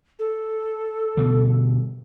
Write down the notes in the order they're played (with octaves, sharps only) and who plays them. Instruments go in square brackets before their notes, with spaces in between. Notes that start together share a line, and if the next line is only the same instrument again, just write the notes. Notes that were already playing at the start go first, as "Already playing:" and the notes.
[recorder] A4
[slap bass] B2 D3 G3